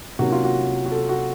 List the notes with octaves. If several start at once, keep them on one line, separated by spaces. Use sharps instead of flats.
C3 D#3 F#3 A#3 C#4 F#4
F4
F#4
F#4
A4
F#4